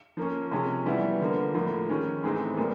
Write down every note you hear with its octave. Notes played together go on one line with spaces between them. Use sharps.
F3 A#3 C#4
C3 F3 G#3 C#4
E3 G3 B3 E4
D3 F3 A#3
A2 F3 A#3
D#3 G#3 C#4
A2 E3 G#3 C4 D#4
A#2 G3 A#3